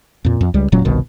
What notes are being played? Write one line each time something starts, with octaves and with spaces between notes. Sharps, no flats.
F2 A#2
F2
C#2 G3
E1 A#2 F#3 C#4
G1 C2 B2 D#3